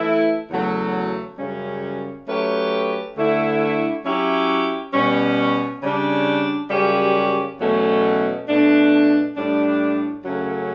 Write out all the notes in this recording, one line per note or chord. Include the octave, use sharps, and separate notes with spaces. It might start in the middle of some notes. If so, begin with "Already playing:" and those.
Already playing: E3 A3 E4
E2 C#3 F#3 A3
F#2 C#3 G3 C#4
F#3 A3 C#4 G4 B4
D2 D3 A3 E4
F#3 C#4 E4 G4
B2 G3 C#4
C#3 G3 D4
F#2 C#3 G3 C#4 G4
E2 B2 F#3 A3 C#4
B2 A3 D4
A2 G3 D4
F#2 C#3 F#3 A3 C#4